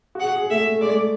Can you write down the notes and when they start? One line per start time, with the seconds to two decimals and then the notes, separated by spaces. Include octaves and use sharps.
0.15 F#4
0.19 G#4 F#5
0.36 G#4
0.50 A3 E5
0.66 A3
0.81 G#3 D5
0.91 A3